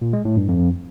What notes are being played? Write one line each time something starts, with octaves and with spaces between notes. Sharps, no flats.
A#2
G#3
A2
G2
F2